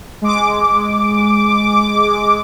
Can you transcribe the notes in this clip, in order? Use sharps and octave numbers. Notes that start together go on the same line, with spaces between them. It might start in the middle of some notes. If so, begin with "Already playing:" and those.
G#3 D6